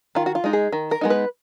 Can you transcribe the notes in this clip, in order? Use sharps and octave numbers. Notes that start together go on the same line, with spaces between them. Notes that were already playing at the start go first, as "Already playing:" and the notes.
D#3 F4
F#4
F4
G#3 D#4
G#4
D#3
A#4
G#3 B3 D#4
B4